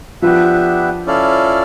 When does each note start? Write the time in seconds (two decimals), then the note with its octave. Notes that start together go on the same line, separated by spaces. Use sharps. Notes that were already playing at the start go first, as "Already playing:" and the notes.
0.22 F3 B3 D4 G4 B4 E5
1.06 C#4 E4 A4 D5 F5